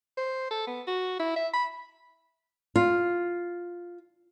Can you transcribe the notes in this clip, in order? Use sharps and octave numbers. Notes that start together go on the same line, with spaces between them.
C5
A4
B3
F#4
E4
E5
B5
F4